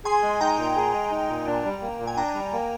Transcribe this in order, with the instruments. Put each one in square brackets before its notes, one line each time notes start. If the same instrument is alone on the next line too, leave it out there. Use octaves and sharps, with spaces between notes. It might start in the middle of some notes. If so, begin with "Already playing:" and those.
[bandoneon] G#4 [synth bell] G#5 C6
[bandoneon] G#3
[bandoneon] D#4 [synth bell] G5 A#5
[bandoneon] A#2
G#4
G#3
D#4
A#2
D4
G3
A#3
A#2
[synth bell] G#5
[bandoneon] D4 [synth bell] G5 A#5
[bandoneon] G3
A#3